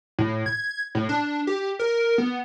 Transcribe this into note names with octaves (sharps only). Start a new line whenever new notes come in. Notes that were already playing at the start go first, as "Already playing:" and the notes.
A2
G#6
A2
D4
G4
A#4
B3